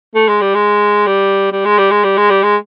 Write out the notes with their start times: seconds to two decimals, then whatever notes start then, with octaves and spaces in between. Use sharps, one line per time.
0.15 A3
0.28 G#3
0.41 G3
0.55 G#3
1.07 G3
1.52 G3
1.65 G#3
1.78 G3
1.91 G#3
2.04 G3
2.17 G#3
2.30 G3
2.43 G#3